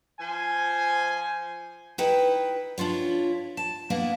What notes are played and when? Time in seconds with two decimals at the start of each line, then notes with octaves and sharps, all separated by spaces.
0.20 F3 C5 G#5
1.98 D#4 E4 B4 G5
2.78 D4 E4 F4 C#5
3.57 A5
3.90 A#3 B3 D4 E4